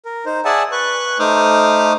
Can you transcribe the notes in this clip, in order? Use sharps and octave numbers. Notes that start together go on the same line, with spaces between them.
A#4
D#4 C5
G#4 D5 E5 F#5 G#5 A5
B4 C#6 F#6
A3 D#4 C5 D6 D#6 F6